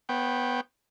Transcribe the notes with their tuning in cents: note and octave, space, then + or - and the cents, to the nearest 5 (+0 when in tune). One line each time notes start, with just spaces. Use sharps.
B3 +0 C#5 -45 G5 +0